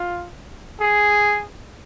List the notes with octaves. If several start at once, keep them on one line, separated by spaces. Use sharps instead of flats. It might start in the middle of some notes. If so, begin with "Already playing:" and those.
Already playing: F4
G#4